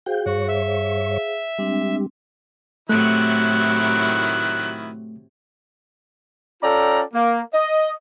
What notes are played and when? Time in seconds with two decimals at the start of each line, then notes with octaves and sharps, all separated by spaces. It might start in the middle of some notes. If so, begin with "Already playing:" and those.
0.06 F#4 G#4 C5 F5 G5
0.26 G2 F#4 C#5 F#5
0.48 E5
1.58 G3 G#3 C4 D4
2.89 A2 C3 D#3 F#3 A3 E4 F#6
6.62 C#4 F4 A4 D5 G5 A#5
7.14 A#3
7.53 D#5